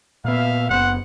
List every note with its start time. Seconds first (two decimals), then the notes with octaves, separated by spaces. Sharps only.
0.25 A#2 B3 E5 F5
0.69 F#1 A2 B3 C5 F#5